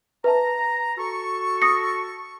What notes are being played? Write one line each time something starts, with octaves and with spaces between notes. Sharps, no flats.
B4 E5 A5 A#5
F#4 A4 C#6
D#6 A#6 C#7